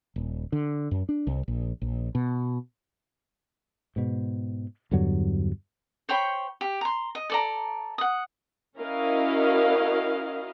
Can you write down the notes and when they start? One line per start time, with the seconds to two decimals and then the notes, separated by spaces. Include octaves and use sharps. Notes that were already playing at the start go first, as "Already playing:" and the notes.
0.16 D#1
0.52 D3
0.91 F#2
1.09 D4
1.27 C2
1.48 A#1
1.82 A#1
2.15 B2
3.96 G#2 B2
4.91 E2 G2 D3 F#3
6.09 C5 C#5 G5 B5
6.61 G4
6.81 A#5 C6
7.15 D#5
7.30 A4 D5 A#5
7.98 F#5 D#6
8.77 C#4 E4 F#4 A#4 D#5 F5